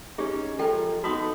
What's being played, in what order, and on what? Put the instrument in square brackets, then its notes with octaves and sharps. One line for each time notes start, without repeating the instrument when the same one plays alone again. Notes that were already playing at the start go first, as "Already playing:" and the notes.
[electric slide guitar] C#4 D#4 [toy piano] G4 G#4
[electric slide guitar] F3 G#3 A#4 [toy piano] A4 G5
[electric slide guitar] B3 D#4 A4 [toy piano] F#4 C6 D#6